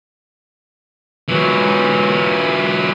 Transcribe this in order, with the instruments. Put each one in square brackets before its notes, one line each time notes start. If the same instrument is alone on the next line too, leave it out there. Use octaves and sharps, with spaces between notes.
[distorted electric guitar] E3 F#3